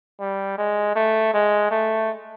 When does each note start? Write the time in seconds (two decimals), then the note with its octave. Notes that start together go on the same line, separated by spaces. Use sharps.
0.20 G3
0.58 G#3
0.96 A3
1.34 G#3
1.71 A3